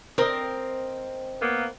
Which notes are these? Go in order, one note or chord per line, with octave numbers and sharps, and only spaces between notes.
C4 A#4 D#5
A#3 B3